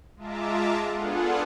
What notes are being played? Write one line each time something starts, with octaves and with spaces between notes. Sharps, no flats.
G#3 F4 E5 A5 A#5 D6
B3 D4 F4 G#4 A4 F#5